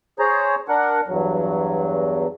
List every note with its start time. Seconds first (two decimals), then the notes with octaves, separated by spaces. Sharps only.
0.19 G#4 C5 C#5 A#5
0.68 D4 A#4 F#5
1.07 E2 G2 F#3